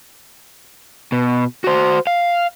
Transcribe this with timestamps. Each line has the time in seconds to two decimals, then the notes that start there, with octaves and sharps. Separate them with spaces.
1.12 B2
1.64 F#4 C5
2.07 F5